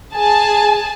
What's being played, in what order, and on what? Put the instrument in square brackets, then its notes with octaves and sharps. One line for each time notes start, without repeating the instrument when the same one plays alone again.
[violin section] G#4 G#5 A5